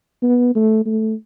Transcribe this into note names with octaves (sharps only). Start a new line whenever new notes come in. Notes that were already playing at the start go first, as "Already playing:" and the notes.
B3
A3
A3